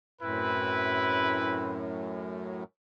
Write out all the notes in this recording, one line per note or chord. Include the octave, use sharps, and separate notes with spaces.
F#2 A2 C4 E4 B4